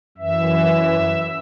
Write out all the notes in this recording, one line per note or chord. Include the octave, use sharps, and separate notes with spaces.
F#2 E3 E5